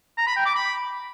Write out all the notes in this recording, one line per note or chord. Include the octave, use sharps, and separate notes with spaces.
A#5
B5
G5
D6
B5